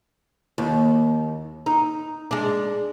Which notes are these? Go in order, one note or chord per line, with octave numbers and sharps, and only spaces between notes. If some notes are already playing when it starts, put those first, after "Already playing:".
D#2
D#4
G#3 D4